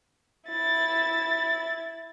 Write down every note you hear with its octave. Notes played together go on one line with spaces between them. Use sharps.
E4 A6